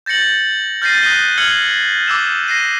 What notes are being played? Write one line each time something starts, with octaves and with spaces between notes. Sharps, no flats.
G6 A6 A#6 C#7 F#7
F6 G6 A6 A#6 C7 D#7
D#6 F#6 A#6 B6 D#7 G7
F6 G#6 C#7 F#7 G7
D6 E6 E7
A#6 C7 D#7 G7